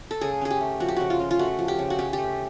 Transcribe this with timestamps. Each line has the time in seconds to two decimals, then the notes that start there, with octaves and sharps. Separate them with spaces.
0.11 A4
0.21 C#3 G#4
0.41 C#4 G#4
0.50 G4
0.61 A3
0.80 F3 F#4
0.88 G4
0.96 C#3 F#4
1.10 F4
1.20 C#4
1.31 F4
1.39 A3 F#4
1.59 F3
1.68 G4
1.79 C#3
1.90 F#4
1.98 C#4 G4
2.13 A3 G4